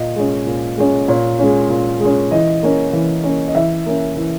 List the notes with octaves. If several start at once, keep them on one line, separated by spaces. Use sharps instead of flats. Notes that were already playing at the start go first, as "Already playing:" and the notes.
Already playing: A#2 D#5
G#3 C#4
A#2
G#3 C#4
A#2 C#5
G#3 C#4
A#2
G#3
C#4
E3 D#5
A#3 C#4
E3
A#3 C#4
D#5
E3 E5
A#3 C#4
E3